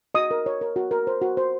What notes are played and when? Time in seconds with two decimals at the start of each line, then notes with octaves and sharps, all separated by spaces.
0.15 F#4 D#5 D#6
0.31 A#4
0.46 C#5
0.61 A#4
0.76 F#4
0.91 A#4
1.07 C5
1.22 F#4
1.37 C5